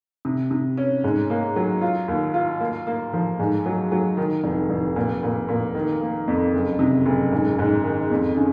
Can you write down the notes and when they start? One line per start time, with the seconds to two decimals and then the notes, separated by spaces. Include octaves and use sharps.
0.25 C3
0.51 C3
0.77 C#4
1.04 G#2
1.30 A#3
1.56 F#3
1.81 F4
2.08 D#2
2.34 F4
2.60 A#3
2.87 A#3
3.13 F3
3.39 G#2
3.66 F#3
3.92 F#3
4.17 D#3
4.44 F1
4.70 F1
4.96 A#2
5.23 A#2
5.48 A#2
5.75 D#3
6.01 A#3
6.28 F2
6.54 F#1
6.79 C3
7.06 F#1
7.32 G#2
7.59 G#2
7.84 D#3
8.11 F2
8.37 C#3